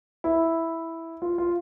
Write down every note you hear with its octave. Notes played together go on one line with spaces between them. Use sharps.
E4
F4
F4